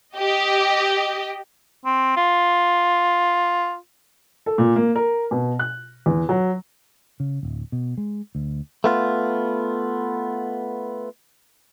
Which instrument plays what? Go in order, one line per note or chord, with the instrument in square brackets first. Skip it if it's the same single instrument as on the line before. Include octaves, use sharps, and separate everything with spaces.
[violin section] G4 D#5
[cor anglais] C4
F4
[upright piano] A4
A#2
A#3
A#4
B2
F#6
E2
F#3
[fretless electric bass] C#3
D1
B2
G#3
D2
[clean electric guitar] A3 B3 F4